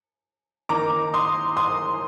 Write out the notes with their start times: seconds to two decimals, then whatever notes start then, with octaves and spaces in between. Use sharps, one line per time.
0.69 D#3 A#3 D#4 A#5 D6
1.14 C6 D#6
1.57 C6 D#6